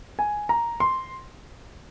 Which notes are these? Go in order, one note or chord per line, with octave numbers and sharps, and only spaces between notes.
G#5
A#5
C6